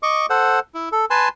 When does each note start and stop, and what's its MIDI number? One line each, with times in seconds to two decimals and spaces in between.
0.03 0.26 75
0.03 0.26 85
0.03 0.26 86
0.30 0.59 69
0.30 0.59 72
0.30 0.59 78
0.74 0.89 64
0.92 1.05 69
1.10 1.29 71
1.10 1.29 80
1.10 1.29 81
1.10 1.29 84